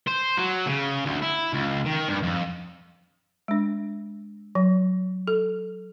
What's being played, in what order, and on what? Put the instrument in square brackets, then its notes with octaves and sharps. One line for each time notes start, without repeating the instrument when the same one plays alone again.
[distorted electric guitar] C5
F#3
C#3
D2
E4
C#2
D#3
G2
F2
[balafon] G#3 D4
F#3
A4